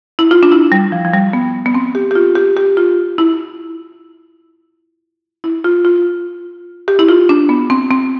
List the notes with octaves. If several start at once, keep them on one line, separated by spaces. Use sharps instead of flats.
E4
F4
D4
E4
G3
F3
F3
G3
B3
B3
C4
G4
G4
F4
G4
G4
F4
E4
E4
F4
F4
G4
E4
F4
D4
B3
C4
C4